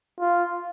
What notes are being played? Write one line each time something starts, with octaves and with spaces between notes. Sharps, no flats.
F4